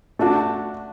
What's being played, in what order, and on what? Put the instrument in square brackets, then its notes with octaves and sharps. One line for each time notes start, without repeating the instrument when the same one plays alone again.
[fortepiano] A3 D4 F#4 [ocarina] A5